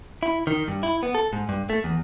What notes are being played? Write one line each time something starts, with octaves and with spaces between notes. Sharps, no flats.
E4
D#3
G2
E4
B3
A4
G#2
G2
A3
E2